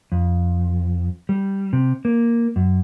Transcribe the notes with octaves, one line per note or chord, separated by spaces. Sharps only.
F2
G3
C3
A#3
F#2